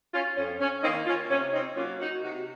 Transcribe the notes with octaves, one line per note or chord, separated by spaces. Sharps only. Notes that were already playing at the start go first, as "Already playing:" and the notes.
C#4 F4
F2 C#4
C#4
D#3 A#3 C4 D#4
C#4 F4
C3 C#4
C4 D#4
F#3 A#3 C#4 F4
D#4 F#4
C3 D#4 F#4